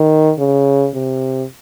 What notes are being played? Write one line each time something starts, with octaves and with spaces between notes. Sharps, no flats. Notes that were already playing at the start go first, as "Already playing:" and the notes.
Already playing: D#3
C#3
C3